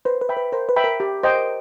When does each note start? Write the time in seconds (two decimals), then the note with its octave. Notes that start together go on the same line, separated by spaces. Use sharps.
0.05 B4 C5
0.21 B4
0.29 E5 G5 B5
0.37 B4
0.52 A#4 C5
0.69 B4
0.76 E5 G5 B5
0.84 A#4
1.00 G4
1.23 C5 D#5 G5